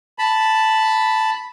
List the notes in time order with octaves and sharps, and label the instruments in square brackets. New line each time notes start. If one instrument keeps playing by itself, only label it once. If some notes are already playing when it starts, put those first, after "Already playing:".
[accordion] A5 B5